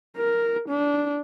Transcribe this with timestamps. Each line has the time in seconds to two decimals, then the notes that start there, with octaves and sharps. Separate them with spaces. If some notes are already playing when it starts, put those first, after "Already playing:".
0.17 A#4
0.69 D4